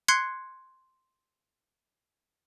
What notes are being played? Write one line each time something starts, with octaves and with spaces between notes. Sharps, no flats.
C6 F#6 G#6 C7 C#7